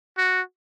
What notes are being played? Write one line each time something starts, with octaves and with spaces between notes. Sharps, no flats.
F#4